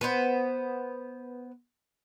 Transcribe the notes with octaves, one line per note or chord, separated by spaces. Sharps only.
B3 B4 C5